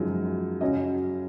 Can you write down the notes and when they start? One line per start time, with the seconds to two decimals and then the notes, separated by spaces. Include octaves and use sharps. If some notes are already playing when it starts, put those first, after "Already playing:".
Already playing: F#2 C#3 F3 G#3 D#4
0.61 F#2 C#3 F#3 C#4 D#5